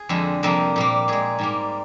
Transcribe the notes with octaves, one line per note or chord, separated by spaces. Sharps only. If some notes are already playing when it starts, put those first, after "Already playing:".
Already playing: G#4
F2 D3 G#3
F2 C3 G3 A#3 A#4
A#2 G3 A#3
A#2 G#3 G#4
G#2 G3 A#3